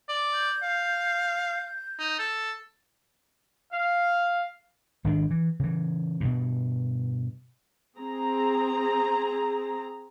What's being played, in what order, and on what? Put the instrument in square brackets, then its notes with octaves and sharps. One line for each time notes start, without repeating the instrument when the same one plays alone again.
[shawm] D5
[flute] G6
[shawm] F5
D#4
A4
[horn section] F5
[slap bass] G#1 D#3 G#3 D4
E3
C#3 E3
G2 B2
[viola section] C4 G#4 A#5